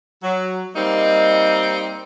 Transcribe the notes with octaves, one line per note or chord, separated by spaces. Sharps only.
F#3
G3 A#3 C4 D#4